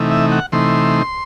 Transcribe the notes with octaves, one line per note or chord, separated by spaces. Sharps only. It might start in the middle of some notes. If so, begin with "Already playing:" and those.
Already playing: C3 E3 A3 D#4
E5
F#5
C3 E3 A3 D#4 C6